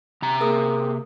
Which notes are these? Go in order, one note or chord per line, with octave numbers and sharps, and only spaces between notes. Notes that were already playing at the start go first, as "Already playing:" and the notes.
C3 A#5
A#3 G#4 A#4 D#6